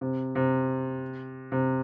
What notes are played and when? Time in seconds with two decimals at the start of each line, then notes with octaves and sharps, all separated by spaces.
0.01 C3
0.35 C3
1.52 C3